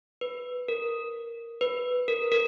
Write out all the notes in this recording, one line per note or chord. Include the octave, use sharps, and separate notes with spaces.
B4
A#4
B4
A#4
A#4